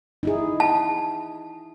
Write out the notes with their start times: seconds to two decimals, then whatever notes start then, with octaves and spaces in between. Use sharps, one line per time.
0.23 D#4 E4 G#4
0.60 A5